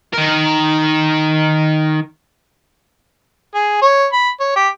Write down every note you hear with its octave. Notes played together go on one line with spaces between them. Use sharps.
D#3 A#4
G#4
C#5
B5
C#5
G4